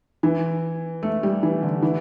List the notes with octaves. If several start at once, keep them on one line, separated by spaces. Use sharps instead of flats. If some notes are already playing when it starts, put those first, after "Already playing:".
E3
A3
G3
E3
D3
E3